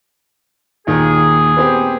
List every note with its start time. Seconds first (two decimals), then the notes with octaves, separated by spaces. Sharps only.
0.87 D#2 A#2 D#3 G#4
1.57 B3 C4 G4